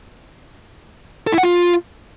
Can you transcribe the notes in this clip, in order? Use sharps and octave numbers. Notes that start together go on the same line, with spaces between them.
A4
E4
F#5
F4